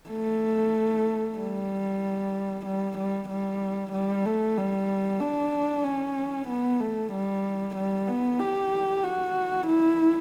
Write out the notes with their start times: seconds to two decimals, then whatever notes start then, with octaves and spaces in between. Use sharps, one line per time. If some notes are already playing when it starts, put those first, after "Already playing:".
0.10 A3
1.38 G3
2.66 G3
2.98 G3
3.29 G3
3.93 G3
4.26 A3
4.57 G3
5.20 D4
5.84 C#4
6.48 B3
6.80 A3
7.13 G3
7.76 G3
8.07 B3
8.40 G4
9.04 F#4
9.67 E4